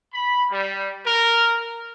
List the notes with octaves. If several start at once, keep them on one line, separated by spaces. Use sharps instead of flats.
B5
G3
A#4